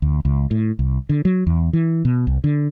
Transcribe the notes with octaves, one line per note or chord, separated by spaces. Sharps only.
D2
C#2
A2
C2
D3
F#3
E2
E3
B2
C2
D3